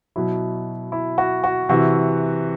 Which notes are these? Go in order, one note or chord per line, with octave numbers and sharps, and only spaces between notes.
B2 F#3 E4
E4
F#4
F#4
C3 E3 F#4